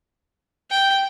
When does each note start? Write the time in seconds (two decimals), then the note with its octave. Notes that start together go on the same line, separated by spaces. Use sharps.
0.71 G5